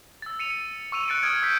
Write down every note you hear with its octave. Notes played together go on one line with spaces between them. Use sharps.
E6 A6
C#7 D#7 F7
C#6 E6 D#7 F7
F#6 A6 C#7 D7
D#6 F6 G#6 C#7 D7
E6 G6 B6